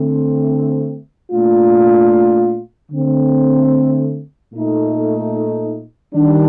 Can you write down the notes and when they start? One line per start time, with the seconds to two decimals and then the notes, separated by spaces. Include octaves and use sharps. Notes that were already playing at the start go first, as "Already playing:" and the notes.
Already playing: D3 A3 C4
1.31 A#2 A3 D4 F4
2.92 D3 A3 C4
4.53 A#2 A3 D#4
6.14 D#3 G3 D4